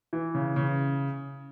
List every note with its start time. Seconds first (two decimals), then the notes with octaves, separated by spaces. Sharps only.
0.13 E3
0.35 C#3
0.56 C#3